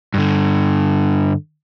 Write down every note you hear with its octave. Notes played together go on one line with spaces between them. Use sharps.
G2 D3